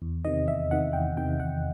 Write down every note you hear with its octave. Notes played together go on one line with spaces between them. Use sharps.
E2
C3 D#3 D#5
E2 E5
C3 D#3 F#5
E2 G5
C3 D#3 G5
E2 F#5